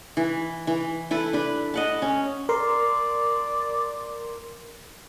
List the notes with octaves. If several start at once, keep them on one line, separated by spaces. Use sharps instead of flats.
E3
E3
E4 A4 B4
D4 B4
D#5 F#5 A5
C#4
A#4 D5 C6